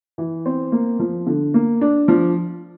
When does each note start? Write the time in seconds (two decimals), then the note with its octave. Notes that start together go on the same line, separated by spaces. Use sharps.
0.18 E3
0.46 C4
0.72 A#3
0.99 F3
1.26 D3
1.54 A#3
1.81 D4
2.08 F3